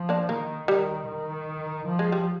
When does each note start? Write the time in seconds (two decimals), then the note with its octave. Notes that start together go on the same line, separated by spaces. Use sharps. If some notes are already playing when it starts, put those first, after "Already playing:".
Already playing: F3
0.09 A#3 D4
0.29 D#3 A#3
0.68 D#3 G3
1.08 D#3
1.87 F3
1.99 G#3
2.12 G3